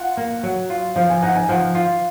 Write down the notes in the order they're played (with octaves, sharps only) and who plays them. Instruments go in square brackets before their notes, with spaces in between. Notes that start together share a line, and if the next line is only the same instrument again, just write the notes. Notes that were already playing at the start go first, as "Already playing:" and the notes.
Already playing: [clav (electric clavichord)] F4 [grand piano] F#5
[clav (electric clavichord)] A#3
F#3
F4
[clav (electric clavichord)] F3 [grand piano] F5
[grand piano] G#5
[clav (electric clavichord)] D#4 [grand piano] F#5
[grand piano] G#5
[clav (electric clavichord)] F3 [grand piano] F#5
[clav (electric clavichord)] F4